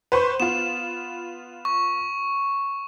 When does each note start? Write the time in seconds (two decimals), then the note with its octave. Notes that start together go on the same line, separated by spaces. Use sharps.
0.12 B4 C5 C#6
0.40 B3 F4 E7
1.65 C#6